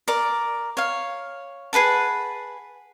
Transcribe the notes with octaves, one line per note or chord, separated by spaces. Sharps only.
A#4 D5
C#5 F5
G#4 B4 F#5 A5